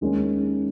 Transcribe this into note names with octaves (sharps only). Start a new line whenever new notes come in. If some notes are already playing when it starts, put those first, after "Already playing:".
D#2 D#3 G#3 C#4